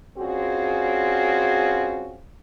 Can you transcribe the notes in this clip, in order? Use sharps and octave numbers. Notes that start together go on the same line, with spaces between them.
G3 C4 C#4 F4 F#4 G#4